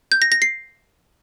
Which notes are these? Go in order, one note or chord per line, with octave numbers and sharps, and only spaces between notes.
G6
A#6
A#6
C7